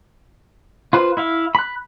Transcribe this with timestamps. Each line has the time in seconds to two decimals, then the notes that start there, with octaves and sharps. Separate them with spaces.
0.93 F4 B4 C5
1.17 E4 E5 F5
1.55 B5 F#6